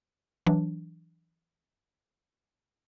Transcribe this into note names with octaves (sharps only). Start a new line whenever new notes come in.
E3 F#3 D4